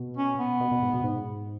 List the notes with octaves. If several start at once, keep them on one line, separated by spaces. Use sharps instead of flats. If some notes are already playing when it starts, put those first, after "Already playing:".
Already playing: B2
C#4
B3
B2
B2
G#2
B2
G#2